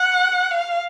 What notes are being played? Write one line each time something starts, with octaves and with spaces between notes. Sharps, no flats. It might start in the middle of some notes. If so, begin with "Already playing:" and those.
Already playing: F#5
F5